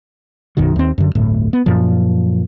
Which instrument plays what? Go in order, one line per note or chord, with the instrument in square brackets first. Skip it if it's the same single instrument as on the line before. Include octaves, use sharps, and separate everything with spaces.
[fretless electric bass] B1 F#2 D#3 F#3
D#2 C4
F#2 D3
D1 G1 A2
B3
F#2 A#2 F3